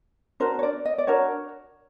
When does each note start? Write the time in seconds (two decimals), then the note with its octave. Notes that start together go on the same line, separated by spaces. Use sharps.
0.40 D4 F#4 A#4 C5
0.59 C#5
0.63 D5
0.85 D#5
0.98 D5
1.07 D4 F#4 A#4 C#5